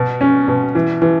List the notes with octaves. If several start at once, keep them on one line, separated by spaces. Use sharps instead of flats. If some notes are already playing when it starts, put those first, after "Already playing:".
Already playing: B2
C#4
B2
E3
E3